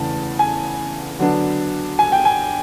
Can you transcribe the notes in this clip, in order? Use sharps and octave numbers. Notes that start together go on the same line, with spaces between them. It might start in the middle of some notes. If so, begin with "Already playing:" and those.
Already playing: E2 C#3 E3 A3 A5
G#5
D3 F#3 B3 D4
G#5
G5
G#5